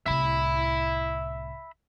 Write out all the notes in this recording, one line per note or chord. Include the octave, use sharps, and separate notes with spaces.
C2 A2 E5 B5